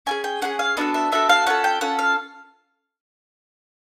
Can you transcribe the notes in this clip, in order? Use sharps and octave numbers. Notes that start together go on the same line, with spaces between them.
C#4 F4 G#4 G#5
G5
C#4 F4 G#4 F#5
F5
B3 D4 F#4 A4 D#5
E5
B3 D4 F#4 A4 E5
F5
C#4 F4 A4 F#5
G5
C#4 F4 A4 F#5
F5